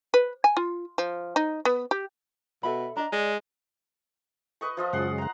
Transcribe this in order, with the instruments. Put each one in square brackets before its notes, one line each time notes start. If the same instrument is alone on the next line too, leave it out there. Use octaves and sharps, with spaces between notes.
[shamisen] B4
G#5
F4
F3
D#4
B3
G4
[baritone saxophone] B2 [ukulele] A4 E5 B5
[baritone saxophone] D4 [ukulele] D#5 A#5
[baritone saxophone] G#3 [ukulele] D5
[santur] B4 D#5 C#6
F3 F4 D#5
[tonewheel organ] F#2 C#3 G#3 [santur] F#5 C6
[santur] F#5 A#5